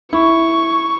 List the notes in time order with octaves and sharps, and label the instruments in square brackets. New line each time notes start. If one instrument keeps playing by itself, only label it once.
[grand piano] E4 [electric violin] C#6